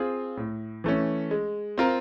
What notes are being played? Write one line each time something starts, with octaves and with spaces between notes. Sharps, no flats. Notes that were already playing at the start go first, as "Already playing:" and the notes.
Already playing: C4 F4 G#4
A2
E3 A3 C#4
G#3
C4 F4 A#4